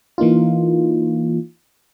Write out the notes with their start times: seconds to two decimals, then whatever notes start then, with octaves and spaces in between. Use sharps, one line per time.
0.18 E3 A#3 D#4 F4